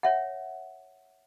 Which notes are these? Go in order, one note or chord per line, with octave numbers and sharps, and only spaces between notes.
C#5 E5 F#5